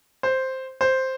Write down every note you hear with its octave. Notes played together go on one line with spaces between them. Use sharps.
C5
C5